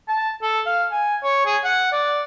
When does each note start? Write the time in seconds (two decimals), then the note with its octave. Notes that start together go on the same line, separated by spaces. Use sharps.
0.08 A5
0.42 A4
0.66 F5
0.92 G#5
1.23 C#5
1.46 G#4
1.64 F#5
1.93 D5